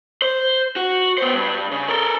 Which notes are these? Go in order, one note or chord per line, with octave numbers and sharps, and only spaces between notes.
C5
F#4
B3 C5
G2
C#3
A4 A#4